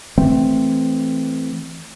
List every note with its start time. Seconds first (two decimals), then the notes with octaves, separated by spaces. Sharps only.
0.18 E3 A3 C4